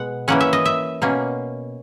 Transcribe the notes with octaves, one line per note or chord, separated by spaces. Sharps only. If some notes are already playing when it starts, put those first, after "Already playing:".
Already playing: B2 G#3 B3 F#5
E3 A#3 C#4 F#5
E5
D#5
E5
B2 A#3 C#4